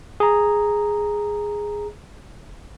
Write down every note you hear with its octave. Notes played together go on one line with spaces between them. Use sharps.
G#4 A#5